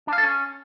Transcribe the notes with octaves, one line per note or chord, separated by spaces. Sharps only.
D4
F5
A4
C#4